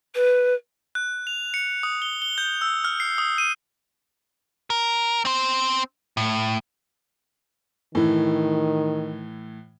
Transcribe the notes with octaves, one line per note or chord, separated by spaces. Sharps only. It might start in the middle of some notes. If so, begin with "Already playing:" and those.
B4
F#6
F7
C#7
D#6
G7
G7
G6
E6
F6
C7
D#6
D#7
A#4
C4 C5
A2
A2 D#3 E3